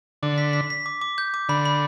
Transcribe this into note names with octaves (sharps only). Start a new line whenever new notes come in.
D3 D6
B6
B6
B6
D6
D6
G6
D6
D3 B5
B5